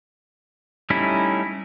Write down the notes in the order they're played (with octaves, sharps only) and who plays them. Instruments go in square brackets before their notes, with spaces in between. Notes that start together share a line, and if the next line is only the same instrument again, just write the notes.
[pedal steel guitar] G3 A3 C#4 D#4 E4